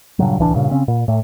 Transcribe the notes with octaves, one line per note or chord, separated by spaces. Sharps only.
G2 A#2 C#3 F#3
D1 C2 E3 D4
G2 A#2 C#3
C#3 C4 C#4
A#2
A2 A3